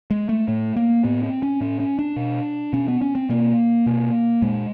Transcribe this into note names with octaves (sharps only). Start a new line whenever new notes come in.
G#3
A3
A2 A3
A#3
A2 B3
C4
C#4
A2 C#4
C#4
D4
B2
B2 C#4
B3
C#4
C4
B2 A#3
B2
A#2 G#3